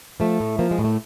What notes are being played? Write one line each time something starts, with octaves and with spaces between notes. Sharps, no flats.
F3 A3
A2
F3 A#3
G#3
A2
A3